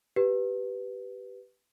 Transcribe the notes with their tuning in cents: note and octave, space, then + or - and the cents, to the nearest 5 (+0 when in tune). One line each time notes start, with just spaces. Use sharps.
G4 -10 B4 +0